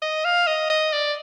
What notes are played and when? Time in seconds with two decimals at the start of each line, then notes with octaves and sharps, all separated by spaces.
0.02 D#5
0.25 F5
0.47 D#5
0.70 D#5
0.92 D5